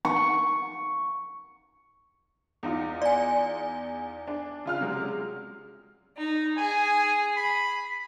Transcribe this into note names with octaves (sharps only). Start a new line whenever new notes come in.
C#6
E2 D#4 F4
D5 G#5
D4
C#3 F4 F6
C3 F#3 G#3
D#4
G#4 G#5
B5